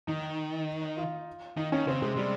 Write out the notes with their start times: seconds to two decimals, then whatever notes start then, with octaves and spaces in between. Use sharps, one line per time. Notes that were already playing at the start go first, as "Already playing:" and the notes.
0.07 D#3 D#4
0.97 F4
1.57 D#3 D#4
1.72 D#3 C#4
1.87 C#3 C4
2.02 C3 G#3
2.16 C3 G3